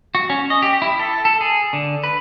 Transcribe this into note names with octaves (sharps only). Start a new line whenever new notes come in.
F#4
C#4
D#5
G4
E4
A4
A4
G#4
D3
B4